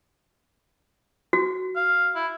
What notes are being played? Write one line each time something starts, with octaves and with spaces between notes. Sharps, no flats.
F#4
F5
E4